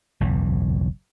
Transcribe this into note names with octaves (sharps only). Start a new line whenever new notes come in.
F#1 B1 E2 E3